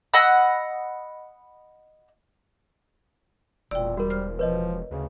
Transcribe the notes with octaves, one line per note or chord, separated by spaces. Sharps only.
D#5 F#5 B5 E6
E1 A#2 D5 G5 E6
G3 F#4 A#4
C5 F6
F3 B4 C#5 D#5
D2 C#3